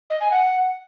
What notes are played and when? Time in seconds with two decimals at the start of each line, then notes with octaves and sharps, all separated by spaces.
0.10 D#5
0.20 G#5
0.31 F#5